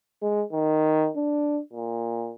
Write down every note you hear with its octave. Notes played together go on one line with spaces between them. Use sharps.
G#3
D#3
D4
A#2